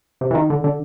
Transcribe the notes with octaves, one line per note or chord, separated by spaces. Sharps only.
C3
E3
D#3
D3
D3